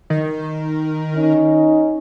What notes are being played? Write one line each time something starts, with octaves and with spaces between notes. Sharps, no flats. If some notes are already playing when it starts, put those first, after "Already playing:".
D#3
C#4 D#4